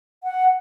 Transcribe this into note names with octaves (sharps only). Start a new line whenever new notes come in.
F#5